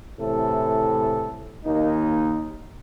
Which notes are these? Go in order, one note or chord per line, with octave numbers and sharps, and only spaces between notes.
A2 C3 E3 A4
D#2 A#3 D#4